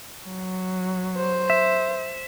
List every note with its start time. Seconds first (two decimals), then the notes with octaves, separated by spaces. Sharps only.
0.25 F#3
1.17 C5
1.50 E5